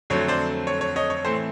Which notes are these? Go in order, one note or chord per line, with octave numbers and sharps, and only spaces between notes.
F2 D3 F#3 A3 C4 C#5
C5 D5
C#5
C#5
C#5 D#5
C#5
A2 E3 A3 C4 C5